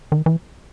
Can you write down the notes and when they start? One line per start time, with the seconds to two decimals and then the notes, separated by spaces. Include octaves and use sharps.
0.12 D#3
0.26 E3